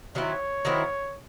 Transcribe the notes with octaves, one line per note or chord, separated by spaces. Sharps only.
D#3 F#3 C4 E4 C#5
D#3 F#3 C4 E4